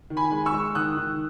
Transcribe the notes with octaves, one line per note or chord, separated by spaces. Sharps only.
D#3
G#5 B5
G#3
C#6 E6
G#3
D#3 D#6 F#6
D#3